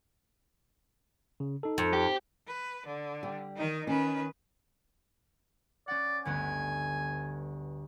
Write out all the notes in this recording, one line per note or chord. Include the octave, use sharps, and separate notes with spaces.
C#3
D#4 A4
F2
G4
B4
D3
G3
D#3 D#4
D#3 C#4 B4
C#4 D5 F#5
G1 D2 B3 G#5